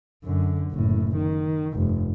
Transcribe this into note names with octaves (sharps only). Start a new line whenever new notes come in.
F#2 D3
F#1 A2
D#3
F1 G2